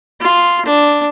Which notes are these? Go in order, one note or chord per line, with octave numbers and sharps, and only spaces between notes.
F4
D4